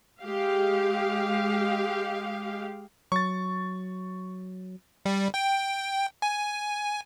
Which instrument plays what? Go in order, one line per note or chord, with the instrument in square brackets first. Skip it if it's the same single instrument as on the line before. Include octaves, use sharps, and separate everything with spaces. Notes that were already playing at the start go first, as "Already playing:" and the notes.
[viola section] G#3 G4 F5
[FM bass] F#3 [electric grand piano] C#6 A6
[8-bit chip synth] G3
G5
G#5